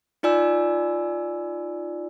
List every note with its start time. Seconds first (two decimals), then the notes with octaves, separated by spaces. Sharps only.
0.23 D#4 F4 D5 G#5 E6